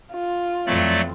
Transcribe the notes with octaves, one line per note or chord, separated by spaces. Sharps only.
F4
F2 E3 F#3 A3 C4 D5